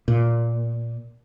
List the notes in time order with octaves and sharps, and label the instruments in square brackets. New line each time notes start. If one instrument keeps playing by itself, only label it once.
[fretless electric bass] A#2